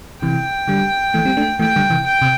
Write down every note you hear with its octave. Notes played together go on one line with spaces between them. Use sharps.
C3 E3 G5
D3 G3
E3 A3
G3 C4
A3 D4
E3 A3 G5
D3 G3
C3 E3
G5
C3